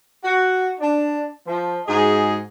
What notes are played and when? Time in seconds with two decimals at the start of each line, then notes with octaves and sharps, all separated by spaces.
0.24 F#4
0.80 D4
1.47 F3
1.86 G#2 F#4 G#4 D#5